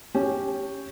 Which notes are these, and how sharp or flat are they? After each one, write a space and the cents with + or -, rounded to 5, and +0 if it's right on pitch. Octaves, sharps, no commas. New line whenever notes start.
C#4 +0 G4 +0